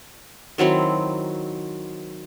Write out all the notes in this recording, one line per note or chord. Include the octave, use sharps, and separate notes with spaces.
D#3 F#3 C4 E4